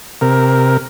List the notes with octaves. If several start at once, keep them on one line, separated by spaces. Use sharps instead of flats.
C3 A#4